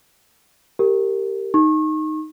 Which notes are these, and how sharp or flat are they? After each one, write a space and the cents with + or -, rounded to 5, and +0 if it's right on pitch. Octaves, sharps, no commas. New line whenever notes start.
G4 +0 A#4 -20
D#4 +0 C#6 -35